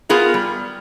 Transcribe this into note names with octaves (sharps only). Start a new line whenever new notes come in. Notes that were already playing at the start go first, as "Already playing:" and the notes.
B3 F4 G#4 A#4
G3